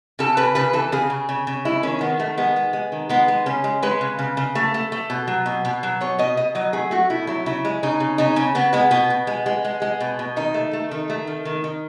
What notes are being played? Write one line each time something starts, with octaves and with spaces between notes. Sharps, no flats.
C#3 A4
C#3 B4
C#3 B4
E3 A4
C#3 G#4
C#3
C#3
C#3
G#3 E4
D#3 C#4
D#3 B3
D#3 A3
G#3 B3
G#3
G#3
D#3
G#3 B3
G#3
C#3 C#4
G#3
G#3 B4
C#3
C#3
C#3
A3
A3
A3
B2
F#3
B2
B2
F#3
B2 C#5
B2 D#5
B2 D#5
F#3 D#5
A3 G#4
A3 F#4
B2 E4
F#3 E4
C#3 E4
G#3
C#3 D#4
C#3
C#3 D#4
C#3 C#4
C#3 B3
G#3 B3
B2 B3
B2
G#3
G#3
G#3
G#3
B2
B2
D#3 D#4
A3
A3
D#3
A3
D#3
D#3
D#3